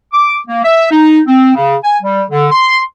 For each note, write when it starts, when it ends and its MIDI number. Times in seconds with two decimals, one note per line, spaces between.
0.13 0.37 86
0.47 0.62 58
0.65 0.89 76
0.91 1.19 63
1.27 1.53 60
1.55 1.76 49
1.84 1.96 80
2.02 2.23 55
2.30 2.47 50
2.52 2.81 84